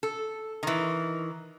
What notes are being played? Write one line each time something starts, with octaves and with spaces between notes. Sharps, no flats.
A4
D#3 E3